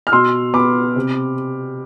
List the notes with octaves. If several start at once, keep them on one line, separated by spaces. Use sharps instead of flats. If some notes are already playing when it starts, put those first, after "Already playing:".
F6
B2 C6 E6
B3 B5 D6
C3